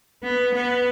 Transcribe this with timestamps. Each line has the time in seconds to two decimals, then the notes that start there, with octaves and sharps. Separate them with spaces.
0.23 B3
0.54 B3